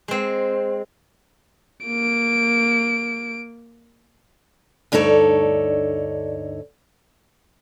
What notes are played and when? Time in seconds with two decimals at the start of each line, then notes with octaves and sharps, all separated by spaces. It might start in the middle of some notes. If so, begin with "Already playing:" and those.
0.08 G#3 C4
1.86 A#3 D7
4.92 D2 G2 D#4 A4 C#5 D5